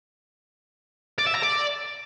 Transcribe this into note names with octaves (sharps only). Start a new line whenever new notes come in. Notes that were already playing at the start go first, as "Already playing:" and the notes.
D5
E5
A#5
D5